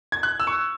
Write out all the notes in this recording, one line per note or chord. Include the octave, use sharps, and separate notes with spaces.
G#6
F#6
E6
C#6